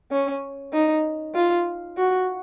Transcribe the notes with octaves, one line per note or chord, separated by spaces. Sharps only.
C#4
D#4
F4
F#4